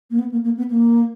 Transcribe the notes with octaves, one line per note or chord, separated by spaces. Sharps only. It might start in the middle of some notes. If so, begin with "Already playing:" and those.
A#3
B3
A#3
A#3
B3
A#3